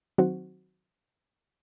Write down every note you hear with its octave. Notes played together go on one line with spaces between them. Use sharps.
D#3 F#3 C4 F#4